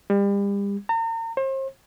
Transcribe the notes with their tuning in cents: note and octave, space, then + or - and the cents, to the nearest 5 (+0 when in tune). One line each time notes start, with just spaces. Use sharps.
G3 +35
A#5 -40
C5 +40